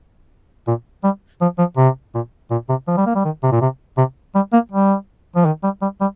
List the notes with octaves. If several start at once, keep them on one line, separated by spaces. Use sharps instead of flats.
A#2
G3
F3
F3
C3
A#2
A#2
C3
F3
G3
A#3
G3
D#3
C3
A#2
C3
C3
G3
A#3
G3
F3
D#3
G3
G3
G3